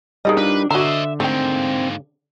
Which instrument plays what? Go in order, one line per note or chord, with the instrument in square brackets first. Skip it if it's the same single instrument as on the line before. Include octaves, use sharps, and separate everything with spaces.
[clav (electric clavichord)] G3 D#4 A#4 [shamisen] G#4 D5 D#5
[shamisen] F3 [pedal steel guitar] D4 [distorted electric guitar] B4
[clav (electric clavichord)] D3 [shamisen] F#4 A#5 [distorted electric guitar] C5 D#5 [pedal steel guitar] E5
[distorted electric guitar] G#2 A#3 [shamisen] A3 G5 [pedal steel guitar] C4